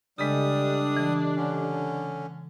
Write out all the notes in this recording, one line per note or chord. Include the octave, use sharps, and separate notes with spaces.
C#3 G3 G#3 D4 G4 A4 D#5 D#6
E3
D3 C#4